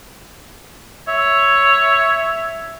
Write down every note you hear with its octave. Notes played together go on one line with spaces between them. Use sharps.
C#5 E5